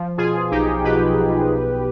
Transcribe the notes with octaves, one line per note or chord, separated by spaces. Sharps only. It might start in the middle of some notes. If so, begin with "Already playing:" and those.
Already playing: F3
B2 F4 G#4
B1 D#4 G4
B2 G4 B4
B2
B1